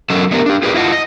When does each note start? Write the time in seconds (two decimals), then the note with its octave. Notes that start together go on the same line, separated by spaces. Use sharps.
0.10 F#3 C#4 A4 A#4 D#5
0.31 A3 B3 D4 G4 G#4 A#4
0.46 D4 G4
0.62 F4 G4 G#4 A#4 B4 D5
0.74 E4 F4 D#5 F#5 A5
0.92 D#5